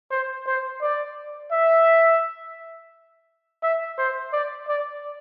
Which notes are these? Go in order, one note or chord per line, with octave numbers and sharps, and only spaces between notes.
C5
C5
D5
E5
E5
C5
D5
D5